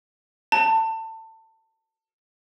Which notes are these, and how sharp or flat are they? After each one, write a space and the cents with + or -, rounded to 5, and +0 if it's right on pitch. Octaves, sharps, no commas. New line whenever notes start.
A5 +25